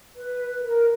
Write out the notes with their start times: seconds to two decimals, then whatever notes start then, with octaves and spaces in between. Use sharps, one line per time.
0.14 B4
0.60 A#4